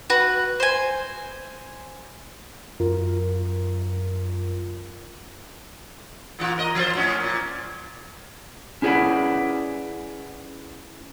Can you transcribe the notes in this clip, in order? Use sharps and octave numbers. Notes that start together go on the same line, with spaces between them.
F#4 B4
C5 G#5
F#2 F4 A#4
A#2 E3 F4
A#4 D#5
F3 F4 C5
A2 C#4
A#2
C#4 E4 G#4 B4 D5 F#5